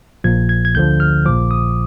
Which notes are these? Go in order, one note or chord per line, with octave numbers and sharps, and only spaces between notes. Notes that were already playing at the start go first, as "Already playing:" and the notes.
A#1 A#2 F3 G#6
G#6
G#6
D2 D3 F3 G6
F6
A#1 A#2 F3 D6
D#6